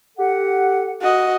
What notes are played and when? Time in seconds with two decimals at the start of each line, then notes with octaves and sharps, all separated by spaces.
0.18 G4 A4 F#5
1.02 F#4 D#5